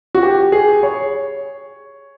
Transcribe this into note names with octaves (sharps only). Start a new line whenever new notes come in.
F#4
G4
G#4
C#5